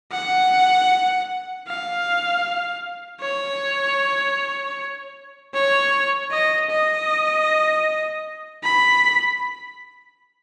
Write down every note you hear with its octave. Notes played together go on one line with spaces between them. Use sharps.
F#5
F5
C#5
C#5
D#5
D#5
B5